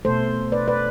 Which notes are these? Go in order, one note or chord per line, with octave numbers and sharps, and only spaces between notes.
B2 A3 A4 C5
B4 D5
B4 D5